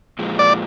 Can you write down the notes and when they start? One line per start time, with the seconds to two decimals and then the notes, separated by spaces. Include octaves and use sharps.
0.19 A#2 F3 G#3
0.39 D5